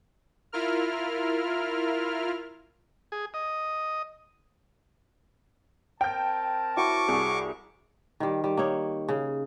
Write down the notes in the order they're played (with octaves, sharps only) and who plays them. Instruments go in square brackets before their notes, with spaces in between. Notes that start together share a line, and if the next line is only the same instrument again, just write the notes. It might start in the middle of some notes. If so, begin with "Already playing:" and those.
[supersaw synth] E4 F4 A#4 F6
[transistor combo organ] G#4
D#5
[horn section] C4 A#4 A5 [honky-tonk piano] G5 G6
[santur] E4 F#4 C#5 [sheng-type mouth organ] C#6 D6
[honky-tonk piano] C2 [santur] G#4
[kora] D#3 G3
G3
A#3 D#4 C#5
C#3